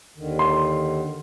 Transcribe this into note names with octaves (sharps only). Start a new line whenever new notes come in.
D#2 D3 D#3
C6